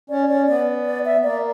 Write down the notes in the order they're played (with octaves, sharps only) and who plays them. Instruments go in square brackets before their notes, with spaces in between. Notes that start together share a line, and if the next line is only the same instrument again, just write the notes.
[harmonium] C#4 [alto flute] D5
[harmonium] C#4 [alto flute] D5
[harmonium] B3 [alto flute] D5
[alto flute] D5
E5
[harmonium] A#3 [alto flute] D5